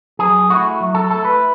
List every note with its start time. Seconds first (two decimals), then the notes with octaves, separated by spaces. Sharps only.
0.19 F#3 G#4
0.49 A3 E4 F#4
0.80 F#3
0.95 A4
1.10 A3 E4 A4
1.25 B4